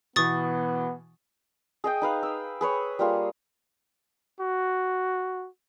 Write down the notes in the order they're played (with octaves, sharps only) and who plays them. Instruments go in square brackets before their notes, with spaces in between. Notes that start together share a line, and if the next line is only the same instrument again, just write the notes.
[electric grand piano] B2 E3 [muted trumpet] B3 [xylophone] C#6 D#6 A6
[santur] G#4 D#5 G5
D#4 B4 F5
E6
G#4 B4 C#5
G3 A#3 F4 G#4
[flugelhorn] F#4